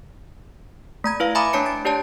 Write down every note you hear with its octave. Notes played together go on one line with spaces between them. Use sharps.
A3 A#5 G#6
E4 B4 F5
E5 G#5 A#5 B5 D6 D#6
A3 D4 C#5 A5 C#7
A6 D7
D4 G4 C#5 D5 A5